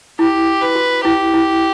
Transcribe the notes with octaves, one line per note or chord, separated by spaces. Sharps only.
E4 G4
B4
F#4
E4 G4
E4